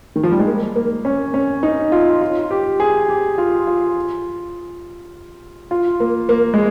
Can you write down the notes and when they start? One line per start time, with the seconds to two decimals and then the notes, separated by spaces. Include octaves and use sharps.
0.16 D#3
0.23 F3
0.31 G3
0.39 G#3
0.47 A#3
0.76 A#3
1.05 C#4
1.34 C#4
1.63 D#4
1.92 F4
2.21 F4
2.51 G4
2.80 G#4
3.09 G4
3.38 F4
3.67 F4
5.71 F4
6.00 A#3
6.29 A#3
6.54 G#3